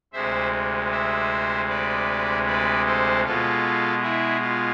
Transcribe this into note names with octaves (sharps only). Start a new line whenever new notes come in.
D2 C3 G#3 C5 E5
C5 E5
B4 D5
B4 D5
A4 C5
B2 G#3 F4 A4
E4 G#4
F4